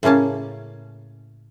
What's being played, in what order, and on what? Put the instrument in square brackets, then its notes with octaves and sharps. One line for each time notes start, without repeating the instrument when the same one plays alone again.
[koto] A2 C#3 A#3 C#4 A5